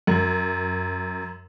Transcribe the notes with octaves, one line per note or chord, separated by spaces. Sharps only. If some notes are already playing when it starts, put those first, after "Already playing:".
F#2